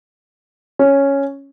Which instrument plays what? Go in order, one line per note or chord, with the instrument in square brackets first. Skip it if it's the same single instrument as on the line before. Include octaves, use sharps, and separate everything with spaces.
[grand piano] C#4